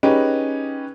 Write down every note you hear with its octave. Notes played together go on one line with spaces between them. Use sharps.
C#4 D#4 G4 G#4 B4